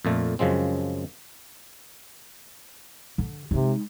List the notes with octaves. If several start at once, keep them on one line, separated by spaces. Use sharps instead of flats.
F2 A#2 A3
F#2 C#3 F3 G#3 C4
D3
C3 G#3 D#4